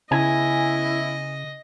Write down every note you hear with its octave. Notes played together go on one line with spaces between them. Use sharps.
C#3 B3 C#4 E4 D#5 G#5